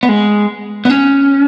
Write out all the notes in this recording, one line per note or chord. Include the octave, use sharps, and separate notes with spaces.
B3
G#3
B3
C#4